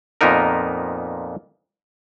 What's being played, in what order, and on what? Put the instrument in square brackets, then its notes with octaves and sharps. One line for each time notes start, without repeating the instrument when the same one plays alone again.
[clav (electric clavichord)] F2 A#2 B3 D#4 A#4